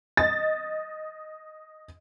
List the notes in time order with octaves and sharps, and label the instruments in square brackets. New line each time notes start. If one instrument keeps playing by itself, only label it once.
[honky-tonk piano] D#5 A6